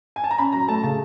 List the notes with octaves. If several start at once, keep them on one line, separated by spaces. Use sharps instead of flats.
G#5
A5
A#5
C#4 B5
F#3 A#5
A3 A5
C#3 A5